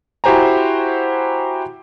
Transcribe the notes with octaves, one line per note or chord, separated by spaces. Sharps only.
E4 F#4 G4 C5 G#5 A#5